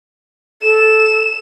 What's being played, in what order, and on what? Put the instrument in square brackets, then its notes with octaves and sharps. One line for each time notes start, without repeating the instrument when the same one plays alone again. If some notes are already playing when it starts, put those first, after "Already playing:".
[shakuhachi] A4 [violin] E7